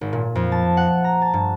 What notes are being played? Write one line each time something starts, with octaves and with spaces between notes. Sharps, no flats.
G#1
A#2
F2
A5
F#5
A#5
A5
G2